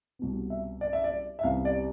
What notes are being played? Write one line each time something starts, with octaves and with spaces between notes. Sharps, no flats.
C2 B2 B3
E5
D5
E5
D5
E5
C2 C3 G3 B3 F5
D5